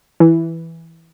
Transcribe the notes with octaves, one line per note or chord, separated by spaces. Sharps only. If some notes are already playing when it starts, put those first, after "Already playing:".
E3